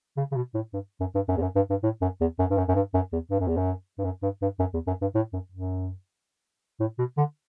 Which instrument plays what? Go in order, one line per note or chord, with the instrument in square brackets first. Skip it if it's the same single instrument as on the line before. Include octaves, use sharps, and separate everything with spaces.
[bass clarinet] C#3
C#3
B2
A2
G2
F#2
G2
F#2
E2
F#2
G2
G2
A2
F#2
E2
F#2
G2
F#2
F#2
G2
F#2
E2
G2
F#2
E2
F#2
G2
F#2
G2
G2
F#2
E2
F#2
G2
A2
F#2
F#2
A2
B2
D3